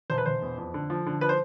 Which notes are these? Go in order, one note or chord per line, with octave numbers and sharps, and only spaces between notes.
E1 C5
B4
E1 C5
E2
F2
D3
F3
D3
F3 B4
C5